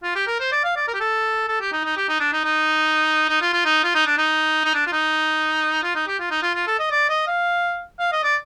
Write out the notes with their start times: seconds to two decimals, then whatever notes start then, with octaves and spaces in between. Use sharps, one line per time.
0.03 F4
0.15 G4
0.27 A#4
0.40 C5
0.52 D5
0.64 F5
0.76 D5
0.88 A#4
0.94 G4
1.00 A4
1.48 A4
1.60 G4
1.72 D#4
1.84 D#4
1.97 G4
2.08 D#4
2.20 D4
2.33 D#4
2.44 D#4
3.29 D#4
3.41 F4
3.53 F4
3.65 D#4
3.84 F4
3.95 D#4
4.07 D4
4.18 D#4
4.65 D#4
4.74 D4
4.87 F4
4.92 D#4
5.83 F4
5.95 D#4
6.07 G4
6.19 F4
6.31 D#4
6.42 F4
6.55 F4
6.67 A4
6.79 D#5
6.91 D5
7.09 D#5
7.27 F5
7.99 F5
8.12 D#5
8.24 D5